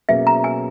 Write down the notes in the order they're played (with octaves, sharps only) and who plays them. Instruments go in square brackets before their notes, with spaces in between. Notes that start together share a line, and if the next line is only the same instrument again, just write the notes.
[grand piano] B2 F#3 A#3 C#4 G#4 [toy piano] E5
[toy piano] A#5
G#5